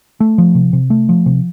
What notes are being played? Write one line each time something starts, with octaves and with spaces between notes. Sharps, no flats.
A3
F3
C3
C3
A3
F3
C3